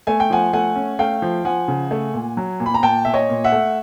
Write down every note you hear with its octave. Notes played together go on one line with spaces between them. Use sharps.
A3 G#5
G5
F3 F#5 G#5
A3 F#5 G#5
C#4
A3 F5 G5
F3
F3 F#5 G#5
C#3
A3
A#2
F#3
A#2
B5
A#5
A#2 G5 A5
A#2 E5
C#5 D#5
A#2
E5 F#5
A3